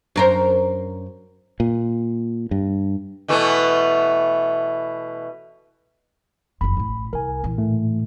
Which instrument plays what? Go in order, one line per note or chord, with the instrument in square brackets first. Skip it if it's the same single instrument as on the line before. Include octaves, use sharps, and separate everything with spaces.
[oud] F#2 A#4 C5
[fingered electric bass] A#2
G2
[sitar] B2 E3 A3
[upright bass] F#1 F2 [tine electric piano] B5
[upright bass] A1 A2
[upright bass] C2 [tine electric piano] A#4 G#5
[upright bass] A#2 E3
[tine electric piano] A2 A3